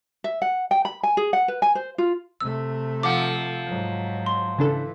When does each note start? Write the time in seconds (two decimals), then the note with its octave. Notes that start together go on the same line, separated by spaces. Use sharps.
0.24 E5
0.42 F#5
0.71 G5
0.85 B5
1.03 G#5
1.17 G#4
1.33 F#5
1.48 B4
1.62 G#5
1.75 C5
1.98 F4
2.41 C3 A3 E6
3.03 F3 F#5 D6
3.66 G#2 F#3
4.26 C6
4.59 C#3 E3 D4 A4